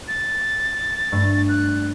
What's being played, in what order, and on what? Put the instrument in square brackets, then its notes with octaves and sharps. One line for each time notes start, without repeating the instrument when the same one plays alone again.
[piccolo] A6
[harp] G2 A3
[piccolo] F#6